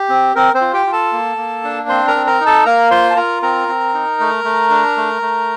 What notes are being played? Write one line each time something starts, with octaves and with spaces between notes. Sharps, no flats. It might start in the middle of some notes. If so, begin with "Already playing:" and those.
Already playing: G4
C4
C4 A#4
C4 C5
F4
G4 G5
F4
A4 A5
A#3
A#3
D4
C4 C5 C6
A#4 A#5
C4
A#4 A#5
D#4
A4 A5
A#3 A#4 A#5
F4 C5 C6
A5
F4 A#4 A#5
C4 A#4 A#5
C4
D#4
A3
A3
D4
A3
A3